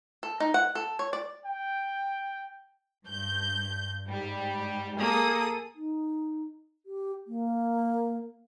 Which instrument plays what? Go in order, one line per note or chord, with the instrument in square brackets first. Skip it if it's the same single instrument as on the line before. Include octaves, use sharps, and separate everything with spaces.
[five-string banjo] A4
D#4
F#5
A4
C#5
D5
[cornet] G5
[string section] G2 G6
G#2 G3
[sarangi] A#3 [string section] G#4 A4 D#6
[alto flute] D#4
G4
A#3